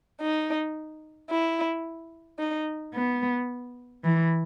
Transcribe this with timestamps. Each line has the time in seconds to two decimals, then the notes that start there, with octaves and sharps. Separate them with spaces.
0.20 D#4
1.29 E4
2.39 D#4
2.95 B3
4.04 E3